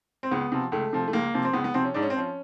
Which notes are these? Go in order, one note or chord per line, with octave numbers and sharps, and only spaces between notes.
C4
C#2 B3
C3 F3
C#2 A3
C3 F3
A3
C#2 A#3
C3 F3
C4
C#2 B3
B3
C3 F3 C4
C#4
G#2 D4
C#4
C4
F3 C#4